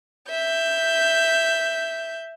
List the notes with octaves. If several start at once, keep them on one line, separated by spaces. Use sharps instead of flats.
E5 G6